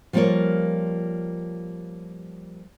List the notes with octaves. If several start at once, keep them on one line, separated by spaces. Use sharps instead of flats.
F3 G3 A#3 F4 A#4 C#5